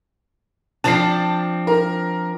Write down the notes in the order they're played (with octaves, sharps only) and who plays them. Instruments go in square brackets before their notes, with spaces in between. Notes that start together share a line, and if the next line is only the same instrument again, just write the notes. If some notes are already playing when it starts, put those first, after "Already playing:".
[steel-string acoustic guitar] F3 C4 D4 [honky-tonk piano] A5 C7
[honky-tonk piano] A#4